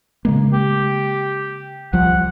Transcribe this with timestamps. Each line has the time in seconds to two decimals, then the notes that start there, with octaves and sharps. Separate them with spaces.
0.25 C#3 G#3 A#3
0.53 G4
1.93 C2 F3 G3 F#5